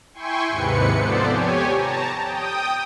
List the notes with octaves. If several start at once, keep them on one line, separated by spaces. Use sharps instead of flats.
E4 G5 G#5 C6 C#6
D#2 G#2 C3 B4 C#7
F3 B3 A4 C5 D5
G4 C#5 G#5
A5 A#5
G5 D#6